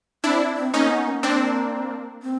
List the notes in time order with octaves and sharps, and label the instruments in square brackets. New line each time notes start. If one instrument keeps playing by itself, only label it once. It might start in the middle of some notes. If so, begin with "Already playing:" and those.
[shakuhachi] C4 [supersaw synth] D4 E4
[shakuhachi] C4
[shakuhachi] A#3 [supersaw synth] C#4 D#4
[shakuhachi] B3
A#3
[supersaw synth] C4 D4
[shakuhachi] C4